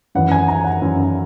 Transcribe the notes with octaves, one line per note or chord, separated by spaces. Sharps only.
F#2 E3 F#5
G#5
A#5
F#5
F#2 E3